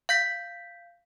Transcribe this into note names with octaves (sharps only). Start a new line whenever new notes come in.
F5 G6 B6